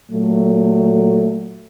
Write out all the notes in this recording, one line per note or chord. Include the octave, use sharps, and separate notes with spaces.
A#2 F#3 A3